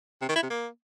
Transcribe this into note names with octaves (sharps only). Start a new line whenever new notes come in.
C3
D#3
E4
C3
A#3